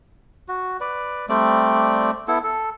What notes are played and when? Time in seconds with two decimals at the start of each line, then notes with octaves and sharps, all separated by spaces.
0.48 F#4
0.81 B4 D5
1.29 G3 A3 C4 D5
2.28 B3 E4 A4
2.44 A4